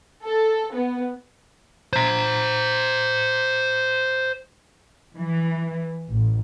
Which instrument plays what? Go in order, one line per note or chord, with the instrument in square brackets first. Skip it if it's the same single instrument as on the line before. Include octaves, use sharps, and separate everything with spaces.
[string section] A4
B3
[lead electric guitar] C5 A#5
[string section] E3
A1